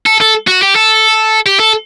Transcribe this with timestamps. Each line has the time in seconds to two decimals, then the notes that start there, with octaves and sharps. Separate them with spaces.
0.06 A4
0.21 A4
0.48 F#4
0.63 G4
0.76 A4
1.46 G4
1.60 A4